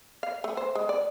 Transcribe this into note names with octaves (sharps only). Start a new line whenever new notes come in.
F5
A3
C5
G#3
D5